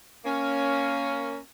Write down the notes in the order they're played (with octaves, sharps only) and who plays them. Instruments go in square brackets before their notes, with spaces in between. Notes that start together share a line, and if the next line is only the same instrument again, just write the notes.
[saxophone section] A#3 C#4